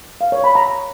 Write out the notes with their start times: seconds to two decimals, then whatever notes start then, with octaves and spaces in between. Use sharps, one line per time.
0.21 F5
0.32 C#5
0.44 B5
0.55 A#5